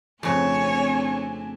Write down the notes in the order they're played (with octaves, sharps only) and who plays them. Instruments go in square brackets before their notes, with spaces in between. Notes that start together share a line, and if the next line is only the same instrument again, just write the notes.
[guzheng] F2 C#3 [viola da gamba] A3 C4 D4 [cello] C#5 [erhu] G#5